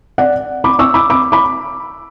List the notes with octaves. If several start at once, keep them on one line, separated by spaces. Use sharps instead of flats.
D5 F#5
B5 D6
C#6 E6
B5 D6
B5 D6
B5 D6